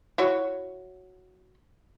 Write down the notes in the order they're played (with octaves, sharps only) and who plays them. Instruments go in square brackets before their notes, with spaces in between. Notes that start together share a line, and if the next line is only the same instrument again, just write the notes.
[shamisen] E4 F#4 C#5